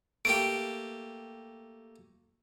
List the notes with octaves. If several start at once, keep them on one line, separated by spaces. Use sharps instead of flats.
A3 A#3 G4 D7